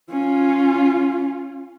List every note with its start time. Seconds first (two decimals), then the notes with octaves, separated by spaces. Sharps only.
0.10 C#4 F4